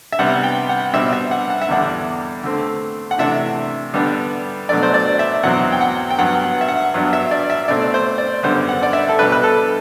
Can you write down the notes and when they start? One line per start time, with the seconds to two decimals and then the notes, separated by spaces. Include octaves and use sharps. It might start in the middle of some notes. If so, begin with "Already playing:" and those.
0.12 E5
0.19 C3 G3 B3 F#5
0.43 G5
0.69 F#5
0.93 B2 G3 C4 E5
1.13 E5
1.31 F#5
1.50 F#5
1.62 E5
1.68 E2 D3 G3 D4 F#5
2.43 D3 A3 C4
3.11 F#5
3.18 C3 E3 A3 D4 E5
3.93 D3 G3 B3 D4
4.69 B2 F#3 A3 D4 D5
4.83 C5
4.94 D5
5.19 E5
5.43 E2 B2 F#3 C4 F#5
5.72 G5
5.81 F#5
6.10 G5
6.19 G2 F#3 B3 F#5
6.44 F#5
6.61 E5
6.68 F#5
6.94 G2 F#3 B3 D4
7.13 E5
7.31 D5
7.50 E5
7.68 B2 A3 C4 D5
7.94 C5
8.18 D5
8.43 F#2 D3 G3 B3 C5
8.69 F#5
8.83 D5
8.93 E5
9.09 A4
9.18 B2 G3 D4 B4
9.32 B4
9.44 A4